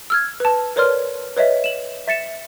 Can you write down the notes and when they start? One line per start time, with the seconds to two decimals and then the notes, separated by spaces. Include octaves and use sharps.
0.10 E6 F6 G#6
0.40 B4 A5
0.76 A#4 B4 C#5 D5 C6 F6
1.37 B4 C#5 D#5 E5
1.64 E7 F#7
2.08 E5 A6 C#7 E7